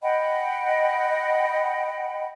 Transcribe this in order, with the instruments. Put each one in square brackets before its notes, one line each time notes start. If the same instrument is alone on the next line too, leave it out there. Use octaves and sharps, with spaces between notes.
[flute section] D#5 F#5 G5 B5